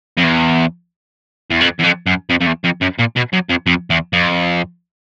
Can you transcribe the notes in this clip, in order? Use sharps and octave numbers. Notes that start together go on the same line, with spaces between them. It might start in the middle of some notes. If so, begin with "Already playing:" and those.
F2
E2
E2
F2
E2
F2
F#2
F2
F2
E2
F2
F#2
A#2
B2
F#2
F2
F2
E2
F2